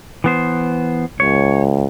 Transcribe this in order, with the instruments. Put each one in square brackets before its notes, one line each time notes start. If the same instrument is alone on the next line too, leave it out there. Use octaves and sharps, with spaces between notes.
[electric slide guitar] E3 B3 C5
[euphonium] C#2 [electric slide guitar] C#5